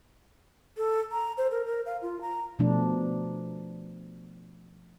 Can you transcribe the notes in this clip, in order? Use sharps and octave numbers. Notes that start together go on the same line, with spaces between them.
A4
A#5
C5
A#4
A#4
F5
F4
A#5
B2 F3 A3 D4